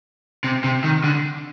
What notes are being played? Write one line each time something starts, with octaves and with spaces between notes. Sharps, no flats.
C3
C3
D#3
D3